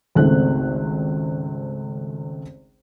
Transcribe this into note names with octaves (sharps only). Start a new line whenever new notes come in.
G#1 C#2 A3 C4 F#6